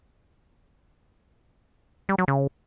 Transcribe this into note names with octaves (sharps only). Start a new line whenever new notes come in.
G3
F#3
C#3